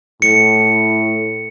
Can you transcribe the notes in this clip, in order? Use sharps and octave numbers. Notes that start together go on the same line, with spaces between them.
A2 C#7